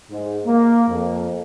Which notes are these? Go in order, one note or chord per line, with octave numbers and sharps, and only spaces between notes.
G#2
A#3
F2